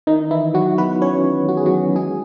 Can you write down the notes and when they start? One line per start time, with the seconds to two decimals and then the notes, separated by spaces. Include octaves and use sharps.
0.07 D#3 D#4
0.31 E3 E4
0.54 F#3 F#4
0.78 B3 B4
1.02 C#4 C#5
1.49 F#4
1.57 G#4
1.66 F#3 F#4
1.96 G#3 G#4